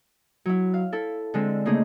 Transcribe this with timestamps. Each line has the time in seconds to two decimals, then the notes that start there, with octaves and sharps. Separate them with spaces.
0.45 F#3 E4
0.74 F5
0.93 E4 A4
1.34 D3 G#3 C4
1.66 C#3 A3 A#3 D#4 G#4